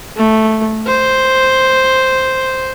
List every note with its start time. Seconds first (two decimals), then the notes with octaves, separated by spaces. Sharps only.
0.16 A3
0.87 C5